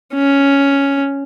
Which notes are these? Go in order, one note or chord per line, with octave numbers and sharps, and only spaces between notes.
C#4